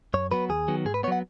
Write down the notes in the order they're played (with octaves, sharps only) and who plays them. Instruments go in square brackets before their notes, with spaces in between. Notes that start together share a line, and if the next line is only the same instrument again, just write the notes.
[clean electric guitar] F#2 C#5
F#3 B3 B4
D#2 G#4
D#3 F#3 B3
G#2 G#4
B4
B3 C#5
F#3 F#5